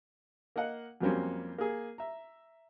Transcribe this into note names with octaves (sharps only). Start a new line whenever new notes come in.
A#3 D#5 F5 F#5
F2 F#3 G3 A#3 C4 C#4
A#3 G#4
E5 A#5